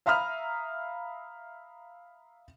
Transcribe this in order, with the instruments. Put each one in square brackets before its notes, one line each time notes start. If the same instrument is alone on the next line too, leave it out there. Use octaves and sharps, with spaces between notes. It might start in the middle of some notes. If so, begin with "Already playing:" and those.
[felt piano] E5 F5 A#5 B5 D#6 F6